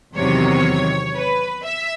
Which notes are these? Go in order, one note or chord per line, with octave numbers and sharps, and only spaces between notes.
E2 C3 D#3 F#3 C#5
B4
E5